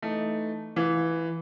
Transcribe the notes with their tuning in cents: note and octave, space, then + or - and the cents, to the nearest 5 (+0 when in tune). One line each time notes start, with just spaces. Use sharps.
E3 +0 A3 +0 D#4 +0
E3 +0 F4 +30